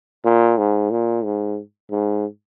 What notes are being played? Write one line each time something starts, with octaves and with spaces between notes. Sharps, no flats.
A#2
G#2
A#2
G#2
G#2